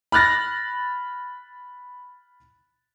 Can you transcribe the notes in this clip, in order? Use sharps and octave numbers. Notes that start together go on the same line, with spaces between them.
B5 F6 F#6 A6 A#6